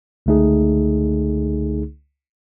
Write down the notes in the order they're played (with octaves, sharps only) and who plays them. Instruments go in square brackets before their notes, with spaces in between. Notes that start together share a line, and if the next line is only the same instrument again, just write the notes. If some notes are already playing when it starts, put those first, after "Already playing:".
[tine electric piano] C#2 D3 A3 D#4 G#4